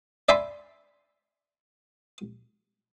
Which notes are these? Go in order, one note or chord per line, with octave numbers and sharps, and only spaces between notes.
D5 E5 G#5 B5 C6